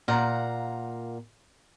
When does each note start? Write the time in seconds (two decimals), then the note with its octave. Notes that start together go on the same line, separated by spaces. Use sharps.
0.08 A#2 F5 F#5 A#5